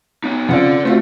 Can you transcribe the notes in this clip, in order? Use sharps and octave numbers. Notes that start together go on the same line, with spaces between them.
B3 D#4
C#3 C4 F4 D5 F#5
A3 C4 F4 F#4